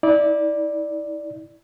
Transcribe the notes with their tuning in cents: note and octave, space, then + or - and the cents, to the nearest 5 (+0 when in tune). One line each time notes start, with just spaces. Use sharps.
E4 -35 D5 +0